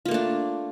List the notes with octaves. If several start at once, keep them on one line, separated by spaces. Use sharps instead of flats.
A3 A#3 D4 F4